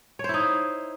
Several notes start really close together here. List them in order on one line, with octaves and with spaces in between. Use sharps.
C#5 C5 E4 D#4